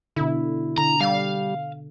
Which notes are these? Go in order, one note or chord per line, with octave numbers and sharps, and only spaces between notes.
B2 D3 E4
D3 A#5
G3 F5